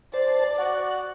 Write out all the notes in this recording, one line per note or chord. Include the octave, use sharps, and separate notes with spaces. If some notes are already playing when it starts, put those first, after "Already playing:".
C5 D5 A5
F#4 F#5